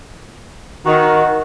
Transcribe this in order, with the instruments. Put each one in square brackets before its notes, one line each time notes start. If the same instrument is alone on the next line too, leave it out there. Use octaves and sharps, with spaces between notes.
[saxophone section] D#3 [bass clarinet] F#4